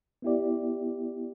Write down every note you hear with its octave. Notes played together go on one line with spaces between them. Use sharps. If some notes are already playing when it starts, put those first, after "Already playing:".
B3 E4 G4 D5